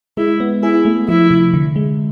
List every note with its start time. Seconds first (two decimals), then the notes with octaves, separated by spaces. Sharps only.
0.17 G#3 E4
0.40 B3
0.63 E4 G#4
0.85 A3
1.08 F3 E4
1.31 C3
1.54 D3
1.76 G#3